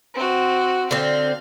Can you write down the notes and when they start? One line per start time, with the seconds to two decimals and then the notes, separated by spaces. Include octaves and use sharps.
0.15 C4 F#4
0.91 D3 C4 F5